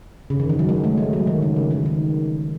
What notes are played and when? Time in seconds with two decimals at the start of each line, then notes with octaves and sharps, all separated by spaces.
0.30 C#3
0.40 D#3
0.49 E3
0.59 F#3
0.69 G#3
0.84 A3
0.98 G#3
1.13 F#3
1.27 D#3
1.42 C#3
1.56 C#3
1.71 E3
1.86 D#3